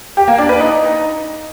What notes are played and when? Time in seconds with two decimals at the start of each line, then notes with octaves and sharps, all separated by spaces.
0.17 G4
0.28 A#3
0.38 D4
0.49 B4
0.60 D#4